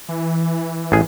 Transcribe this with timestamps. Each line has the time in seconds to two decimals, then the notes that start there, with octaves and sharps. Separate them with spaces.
0.09 E3
0.92 A1 G#4